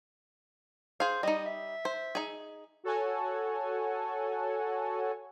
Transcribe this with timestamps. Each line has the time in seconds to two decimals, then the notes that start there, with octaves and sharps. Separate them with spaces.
1.00 G#4 C5 F5
1.23 G3 D#4 D#5
1.46 E5
1.85 C5
2.15 D#4 G#4
2.84 F#4 A4 C#5 F#5 G#5